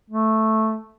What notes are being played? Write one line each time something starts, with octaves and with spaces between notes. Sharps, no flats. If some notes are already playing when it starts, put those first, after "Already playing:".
A3